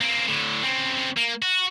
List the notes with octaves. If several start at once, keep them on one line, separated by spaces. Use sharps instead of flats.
A#3 C4
A2 D3
C#3 C4
A#3
F#4